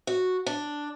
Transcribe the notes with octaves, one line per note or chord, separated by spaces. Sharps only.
F#4
D4